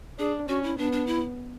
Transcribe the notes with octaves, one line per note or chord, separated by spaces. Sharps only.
D4 G#4
C#4 F#4
E4
B3 D4
D4
E4